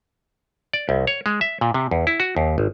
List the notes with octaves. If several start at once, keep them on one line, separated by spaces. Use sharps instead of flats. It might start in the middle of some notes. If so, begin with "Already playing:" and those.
D5
C2
C#5
G#3
E5
A#2
C3
E2
E4
F#4
D#2
G#1